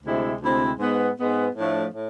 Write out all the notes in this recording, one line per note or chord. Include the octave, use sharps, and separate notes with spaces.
D2 C3 G#3 C4 E4
D2 C3 G#3 C4 E4
G#2 G#3 B3
G#2 G#3 B3
A2 F3 A3 D4
A2